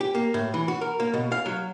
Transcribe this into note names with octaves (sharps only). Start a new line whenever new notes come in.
G4
A#3
A2
E3
F#4
A#4
A#3
B2
F5
F#3